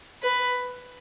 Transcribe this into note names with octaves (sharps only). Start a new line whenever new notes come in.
B4